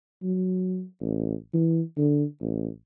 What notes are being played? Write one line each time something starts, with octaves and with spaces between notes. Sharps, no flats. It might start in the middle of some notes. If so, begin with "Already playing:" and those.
F#3
A1
E3
D3
A1